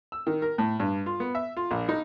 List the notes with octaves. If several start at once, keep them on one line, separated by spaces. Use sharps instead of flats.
E6
D#3
A#4
A2
G2
F4
B3
E5
F4
A#1
D#4